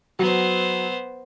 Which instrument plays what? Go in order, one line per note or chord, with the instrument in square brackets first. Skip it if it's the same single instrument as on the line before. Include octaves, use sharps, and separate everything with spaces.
[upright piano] F#3 [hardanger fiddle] B3 C5